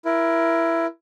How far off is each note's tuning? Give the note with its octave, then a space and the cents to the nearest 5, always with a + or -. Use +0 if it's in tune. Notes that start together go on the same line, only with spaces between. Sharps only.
E4 +15 A#4 +20